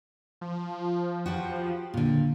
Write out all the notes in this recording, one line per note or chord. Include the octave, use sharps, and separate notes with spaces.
F3
F#4 G4 B4
A#2 D3